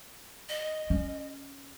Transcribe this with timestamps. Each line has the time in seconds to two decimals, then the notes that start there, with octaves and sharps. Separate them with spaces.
0.49 D#5
0.90 C#4